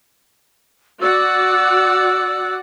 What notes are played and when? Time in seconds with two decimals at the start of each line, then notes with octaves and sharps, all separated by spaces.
1.02 F#4 D5 F#5 E6